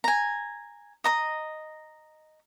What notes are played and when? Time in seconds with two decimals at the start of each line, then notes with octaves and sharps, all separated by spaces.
0.04 G#5 A#5
1.04 D#5 A#5 D#6